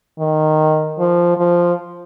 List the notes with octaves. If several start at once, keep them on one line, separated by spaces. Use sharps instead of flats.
D#3
F3
F3